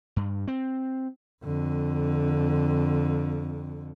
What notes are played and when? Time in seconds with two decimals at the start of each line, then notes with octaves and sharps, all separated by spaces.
0.16 G2
0.48 C4
1.44 F2 D3